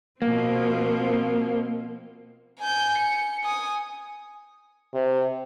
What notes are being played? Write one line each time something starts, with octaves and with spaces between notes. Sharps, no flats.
B2 F3 A#3 C4
G#5 G6
C#7
G#5 D#6
C3